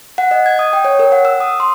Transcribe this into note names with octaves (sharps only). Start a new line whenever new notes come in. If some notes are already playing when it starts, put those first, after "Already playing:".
F#5
D#5
G#6
D#6
G5
C#5
A#4
F#5
E6
D#6
C6